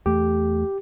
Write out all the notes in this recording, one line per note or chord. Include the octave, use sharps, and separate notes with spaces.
E2 A3 G4